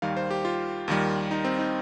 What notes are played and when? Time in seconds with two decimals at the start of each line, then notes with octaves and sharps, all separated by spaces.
0.02 D#2 D#3 G3 F5
0.17 C5
0.30 G4
0.45 F4
0.88 D#2 D#3 G3
1.31 D#4
1.44 C4
1.59 D#4